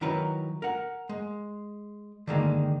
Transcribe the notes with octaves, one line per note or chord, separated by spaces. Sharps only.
D#3 F#3 E4 A#4 B4 C#5
A#4 F#5
G#3
D3 D#3 G#3 A#3